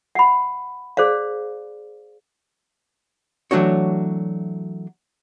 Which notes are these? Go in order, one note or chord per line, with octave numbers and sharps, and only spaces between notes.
F#5 B5
G#4 C5 D5 F5
E3 F#3 A3 D4 F#4 C#5